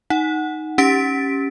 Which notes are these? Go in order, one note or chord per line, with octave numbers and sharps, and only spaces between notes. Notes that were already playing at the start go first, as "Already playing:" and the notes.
D#4 F#5
C#4 G4 A6 B6 D7